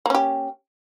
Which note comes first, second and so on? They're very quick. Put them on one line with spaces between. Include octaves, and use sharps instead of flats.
A#3 C#4 G4